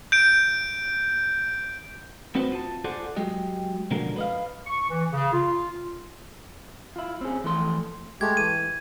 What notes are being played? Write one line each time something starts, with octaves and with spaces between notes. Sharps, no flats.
G6 D7
B3 C4 F#4 B4 C5
F4 A5
F4 G#4 A4 C5 D5 F#5
F#3 G#3 G4 D#5
B2 D3 F3 F#3 G#3 A#4
B4 D#5 F5
C#6
E3
C#3
F4
E4 F4
C4 C#4 G#4
E3 F3 A3 C6
G#3 A3 G4 G#6
E3 D#7